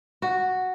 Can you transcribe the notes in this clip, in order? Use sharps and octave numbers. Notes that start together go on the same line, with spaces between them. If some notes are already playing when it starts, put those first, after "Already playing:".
F#4